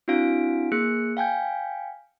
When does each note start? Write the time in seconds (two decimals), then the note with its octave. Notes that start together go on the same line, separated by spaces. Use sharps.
0.08 C4 D4 E4 F#4 F5 D7
0.72 A#3 G#4 F#6 C#7
1.17 F5 G5 G#5 G6